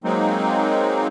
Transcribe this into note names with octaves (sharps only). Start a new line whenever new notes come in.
F#3 G#3 A#3 C4 D#4